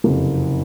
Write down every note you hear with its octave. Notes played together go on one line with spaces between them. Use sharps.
F#1 F2 C3